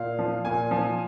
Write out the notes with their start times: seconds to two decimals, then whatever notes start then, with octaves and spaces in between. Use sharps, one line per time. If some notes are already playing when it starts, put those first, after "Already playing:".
Already playing: A#2 F5
0.19 F3
0.45 A#2 G#5
0.71 F3